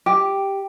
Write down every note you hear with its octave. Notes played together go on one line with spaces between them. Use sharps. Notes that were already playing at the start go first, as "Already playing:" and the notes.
G4